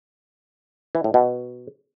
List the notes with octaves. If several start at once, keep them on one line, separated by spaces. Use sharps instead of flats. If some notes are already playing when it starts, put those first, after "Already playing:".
E3
A2
B2